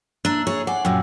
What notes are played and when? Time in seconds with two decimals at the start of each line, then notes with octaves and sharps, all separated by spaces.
0.25 A#3 D4 A#5 E6
0.47 G#4 C#5
0.67 D5 F#5 G#5
0.85 F#2 A#2 G5 D6 E6